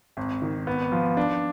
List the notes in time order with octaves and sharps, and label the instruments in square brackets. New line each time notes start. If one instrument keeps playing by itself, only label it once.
[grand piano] G#1
D#3
B3
F3
D4